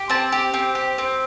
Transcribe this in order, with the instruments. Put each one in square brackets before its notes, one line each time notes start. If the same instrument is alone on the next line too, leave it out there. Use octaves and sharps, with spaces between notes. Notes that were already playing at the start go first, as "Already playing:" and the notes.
Already playing: [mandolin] G4
C4 A5
G4
C4 G5
G4
C4